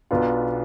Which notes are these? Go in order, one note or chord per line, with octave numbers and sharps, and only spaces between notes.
B1 B2 B3 D4 F4